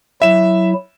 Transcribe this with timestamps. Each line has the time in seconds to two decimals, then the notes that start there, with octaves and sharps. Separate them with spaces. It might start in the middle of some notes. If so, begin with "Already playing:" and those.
0.22 F#3 E4 E5 E7